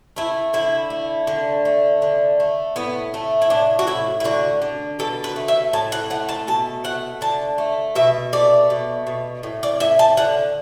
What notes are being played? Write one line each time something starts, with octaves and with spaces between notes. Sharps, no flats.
A3 E4
D3 E4
A3
D3
A3
D3
A3
A2 B3
A3
E4
A2 D4
F#4
A2 E4
E4
D3 F#4
D3
B2 A4
B4
A3
E5
A2 A5
F#5
A3 F#5
A5
B2 A5
A3 F#5
D3 A5
A3
B2 E5
A3 D5
B2
B2
A2
D5
A2 E5
A5
D3 F#5